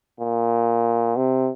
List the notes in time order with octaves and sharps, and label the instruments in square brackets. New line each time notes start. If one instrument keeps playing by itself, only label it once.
[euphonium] A#2
C3